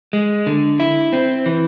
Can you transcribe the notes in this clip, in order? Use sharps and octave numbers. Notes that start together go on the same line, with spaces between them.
G#3
D3
E4
C4
E3